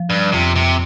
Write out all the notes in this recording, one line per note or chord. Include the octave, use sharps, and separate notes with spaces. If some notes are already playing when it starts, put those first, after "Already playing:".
Already playing: F3
G2
F2 C3
C3